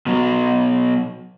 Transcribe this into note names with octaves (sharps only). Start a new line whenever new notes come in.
B2 F#3